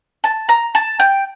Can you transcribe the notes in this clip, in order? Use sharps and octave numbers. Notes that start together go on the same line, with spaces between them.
A5
A#5
A5
G5